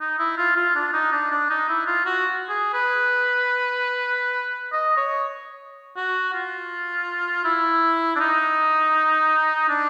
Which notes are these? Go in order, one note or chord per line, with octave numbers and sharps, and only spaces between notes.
D#4
E4
F4
F4
D4
D#4
D4
D4
D#4
E4
F4
F#4
G#4
B4
D#5
C#5
F#4
F4
E4
D4
D#4
D4